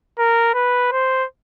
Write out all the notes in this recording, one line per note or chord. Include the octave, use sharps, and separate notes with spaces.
A#4
B4
C5